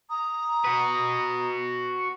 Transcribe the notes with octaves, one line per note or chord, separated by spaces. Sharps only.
A#5 D#6
F#4 B4